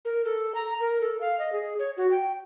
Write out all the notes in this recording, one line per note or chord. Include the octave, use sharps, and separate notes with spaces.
A#4
A4
A#5
A#4
A4
F5
D#5
G#4
C#5
F#4
G5